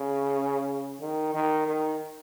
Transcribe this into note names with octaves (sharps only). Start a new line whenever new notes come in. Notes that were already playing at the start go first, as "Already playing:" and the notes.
Already playing: C#3
D#3
D#3
D#3